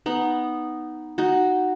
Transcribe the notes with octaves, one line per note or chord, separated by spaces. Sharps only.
B3 D#4
D#4 F#4